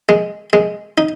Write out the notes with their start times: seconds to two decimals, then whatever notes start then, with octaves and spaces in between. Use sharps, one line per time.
0.09 G#3
0.53 G#3
0.98 D#4